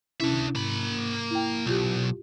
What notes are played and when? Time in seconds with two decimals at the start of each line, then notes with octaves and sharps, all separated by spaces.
0.20 C3 C#4 D4 E4 E5
0.55 G#2 A#3 B5
1.31 E4 G5
1.66 B1 F4 G4